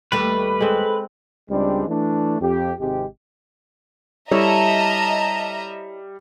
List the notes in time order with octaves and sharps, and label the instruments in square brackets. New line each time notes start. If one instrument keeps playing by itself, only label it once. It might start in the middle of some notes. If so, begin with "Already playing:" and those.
[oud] D#2 G3 A3 [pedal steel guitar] B4
[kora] G#3 C4 [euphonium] A4
[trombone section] C#2 G3 G#3 C4 D4
E3 A3 D4
F2 G4
G#1 C3 G#3 G4
[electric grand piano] G3 [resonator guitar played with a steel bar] E4 A4 C#5 [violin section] D#5 E5 A#5 [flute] A5